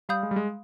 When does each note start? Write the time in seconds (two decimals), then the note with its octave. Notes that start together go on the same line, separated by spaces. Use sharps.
0.09 G3 F5 B5 D#6 G6
0.23 G#3
0.31 G3
0.36 G#3